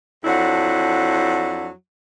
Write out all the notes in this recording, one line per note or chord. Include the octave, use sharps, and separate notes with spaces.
F2 F#3 D4 E4 F#5